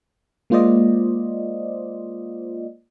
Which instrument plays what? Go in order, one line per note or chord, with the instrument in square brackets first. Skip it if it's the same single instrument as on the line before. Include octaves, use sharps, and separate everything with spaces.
[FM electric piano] G#3 A#3 F4 C5 D5 D#5